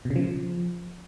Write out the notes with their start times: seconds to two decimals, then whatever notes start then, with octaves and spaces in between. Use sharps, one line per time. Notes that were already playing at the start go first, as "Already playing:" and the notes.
0.05 B2
0.10 C#3
0.16 F3